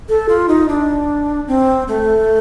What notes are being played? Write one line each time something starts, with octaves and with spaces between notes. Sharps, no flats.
A4
F4
D#4
D4
C4
A3